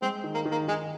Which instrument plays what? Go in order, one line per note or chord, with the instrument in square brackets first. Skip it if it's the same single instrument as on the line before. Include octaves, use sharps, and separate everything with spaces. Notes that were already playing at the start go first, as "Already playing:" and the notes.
[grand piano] G#3 [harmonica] C4
[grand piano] D#3
[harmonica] A#3
[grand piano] D#3
[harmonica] A#3
[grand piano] D#3 [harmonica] G#3